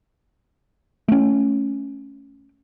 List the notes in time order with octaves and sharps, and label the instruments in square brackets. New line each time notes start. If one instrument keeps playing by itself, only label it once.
[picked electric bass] A3 C#4